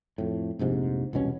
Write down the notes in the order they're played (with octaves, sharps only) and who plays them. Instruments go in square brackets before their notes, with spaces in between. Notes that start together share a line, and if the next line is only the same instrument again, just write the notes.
[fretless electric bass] F2 A2
F1 A#1 G#2 C3
E1 C2 B2 C#4